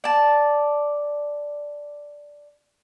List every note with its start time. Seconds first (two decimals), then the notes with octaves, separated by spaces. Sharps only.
0.04 D5 A5